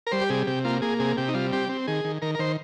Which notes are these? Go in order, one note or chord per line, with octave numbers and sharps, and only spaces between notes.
A#4
G3 C5
G4
C3 G#4
C3 G4
A#3 F4
A#3 G#4
C3 G#4
C3 G4
D#4
G3 F4
C4 G4
C4
D#3 G#4
D#3
D#3 A#4
A#4
D#3 C5